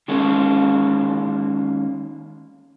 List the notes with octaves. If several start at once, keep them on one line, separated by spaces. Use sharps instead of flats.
D#3 G#3 A#3 C#4